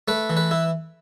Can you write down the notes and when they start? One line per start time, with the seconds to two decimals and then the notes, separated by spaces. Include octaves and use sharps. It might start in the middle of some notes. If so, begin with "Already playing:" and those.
0.08 A3 B4
0.30 E3
0.37 B4
0.51 E4